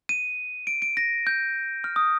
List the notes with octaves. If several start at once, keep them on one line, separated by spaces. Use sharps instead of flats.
D#7
D7
D7
A#6
G6
F6
D#6